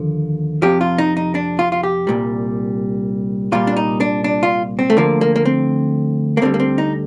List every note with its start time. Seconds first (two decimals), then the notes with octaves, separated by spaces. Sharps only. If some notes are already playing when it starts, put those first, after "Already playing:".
Already playing: D#2 D3 F3
0.62 F2 C3 F3 G4
0.81 F4
0.98 D#4
1.17 D#4
1.35 D4
1.59 F4
1.72 F4
1.83 G4
2.07 C2 A#2 G3
3.52 C2 A#2 G3 F4
3.67 D4
3.77 D#4
4.00 D4
4.24 D4
4.43 F4
4.79 C4
4.90 A3
4.97 D2 D3 F3 A#3
5.21 A#3
5.36 A#3
5.45 C4
6.37 A#3
6.42 D2 D3 G3 C4
6.54 A#3
6.60 C4
6.78 D#4